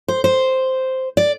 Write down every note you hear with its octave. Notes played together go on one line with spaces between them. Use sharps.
C5
C5
D5